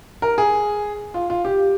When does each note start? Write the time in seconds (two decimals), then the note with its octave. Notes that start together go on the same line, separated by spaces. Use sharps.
0.22 A#4
0.38 G#4
1.14 F4
1.30 F4
1.45 G4